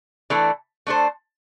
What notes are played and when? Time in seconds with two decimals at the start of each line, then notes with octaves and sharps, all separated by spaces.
0.30 E3 A3 D4 A4
0.87 A3 D4 A4 C5